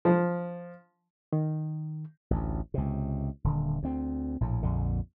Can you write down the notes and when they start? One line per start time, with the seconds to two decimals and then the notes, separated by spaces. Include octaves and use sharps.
0.05 F3
1.33 D#3
2.31 A1 D2
2.74 C#2 C3
3.44 D#1 D3
3.83 D2 C4
4.41 A#1 A2
4.63 A#1 F2 D3